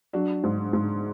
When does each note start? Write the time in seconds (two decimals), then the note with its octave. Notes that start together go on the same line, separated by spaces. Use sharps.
0.13 F#3 D4 F#4
0.44 G#2
0.73 G#2